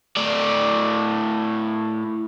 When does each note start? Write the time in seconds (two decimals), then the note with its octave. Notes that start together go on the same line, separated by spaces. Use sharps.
0.17 A2 D5